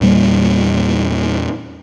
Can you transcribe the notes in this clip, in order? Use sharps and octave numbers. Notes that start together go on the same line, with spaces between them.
E2 A#2 G3 A#3